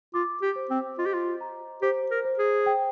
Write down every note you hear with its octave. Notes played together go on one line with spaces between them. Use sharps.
F4 D6
G4
C5
C4
F4 D#5
G4
F4
A#5
G4 C5
A#4
C5
G#4
G5